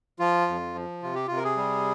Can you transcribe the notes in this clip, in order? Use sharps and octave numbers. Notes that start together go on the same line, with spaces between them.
F3 F4
F2
F3
C3 F4
G4
C3 F4
A#4
G#4
G3